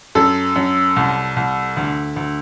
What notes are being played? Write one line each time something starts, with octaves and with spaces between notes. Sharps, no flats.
F#2 A4
F#2
C2
C2
D2
D2